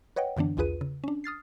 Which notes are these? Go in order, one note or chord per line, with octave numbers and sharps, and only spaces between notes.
B4 C#5 D#5 F#5 G5
F#2 D3 E3 B3 D4
B1 E2 F4 G#4 B4 D#7
C#3
C#4 D4
D#6 F6 A6 C7